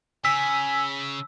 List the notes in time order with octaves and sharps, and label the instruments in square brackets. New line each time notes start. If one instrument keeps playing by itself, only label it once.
[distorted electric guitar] C#3 [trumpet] G#5 [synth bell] E6 [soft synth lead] B6